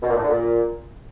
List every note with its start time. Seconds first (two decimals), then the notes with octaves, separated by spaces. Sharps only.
0.02 B2
0.09 A#2
0.16 A2
0.23 D3
0.30 A#2